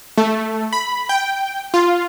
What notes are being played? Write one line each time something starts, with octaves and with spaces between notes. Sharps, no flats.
A3
B5
G5
F4